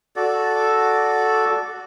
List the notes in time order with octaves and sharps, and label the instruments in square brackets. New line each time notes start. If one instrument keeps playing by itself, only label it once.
[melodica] F#4 A4 D5